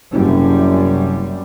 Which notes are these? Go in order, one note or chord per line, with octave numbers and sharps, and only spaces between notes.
F#1 F#2 C3 G3